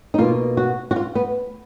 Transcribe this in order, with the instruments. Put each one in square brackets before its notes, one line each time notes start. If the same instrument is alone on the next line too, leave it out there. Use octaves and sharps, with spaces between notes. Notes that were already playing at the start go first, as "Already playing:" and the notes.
[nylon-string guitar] D#4
B2 A#3 F4
F#4
F#4
F4
B3